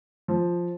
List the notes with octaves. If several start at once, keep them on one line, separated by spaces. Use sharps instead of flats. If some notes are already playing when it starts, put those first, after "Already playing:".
F3